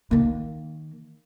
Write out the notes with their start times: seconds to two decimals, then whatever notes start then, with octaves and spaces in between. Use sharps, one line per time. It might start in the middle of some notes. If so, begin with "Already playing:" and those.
0.11 D#3 A#3